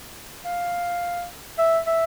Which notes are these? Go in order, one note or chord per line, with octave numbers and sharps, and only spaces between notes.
F5
E5
E5